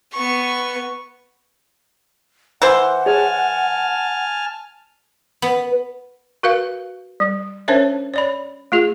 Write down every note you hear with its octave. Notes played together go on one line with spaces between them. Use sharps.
B3 C#6
E3 E4 C5 F#5
G#4 C#5 G#5 A5 F6
B3
F#4 A#4 B4 F5
G3
C#4 D4 A#4 C5 C#5 E5
C#5 D5 B5
A3 F4 G#4